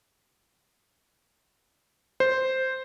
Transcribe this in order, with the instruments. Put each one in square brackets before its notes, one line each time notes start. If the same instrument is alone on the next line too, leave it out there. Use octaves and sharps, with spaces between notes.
[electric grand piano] C5